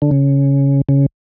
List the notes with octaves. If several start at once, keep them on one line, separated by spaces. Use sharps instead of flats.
D3
C#3
C#3